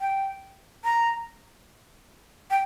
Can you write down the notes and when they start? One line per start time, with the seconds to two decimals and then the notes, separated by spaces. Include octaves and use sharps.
0.01 G5
0.84 A#5
2.51 G5